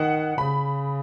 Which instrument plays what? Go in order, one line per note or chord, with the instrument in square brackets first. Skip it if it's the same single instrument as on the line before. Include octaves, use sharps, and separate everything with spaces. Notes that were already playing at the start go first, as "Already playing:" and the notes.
Already playing: [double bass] D#3 [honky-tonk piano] F#5
[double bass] C#3 [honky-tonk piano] B5